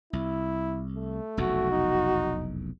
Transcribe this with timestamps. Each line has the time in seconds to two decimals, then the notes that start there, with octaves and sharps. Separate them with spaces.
0.13 C2 E4
0.96 A3
1.37 F1 B1 E2 F#4
1.72 D#4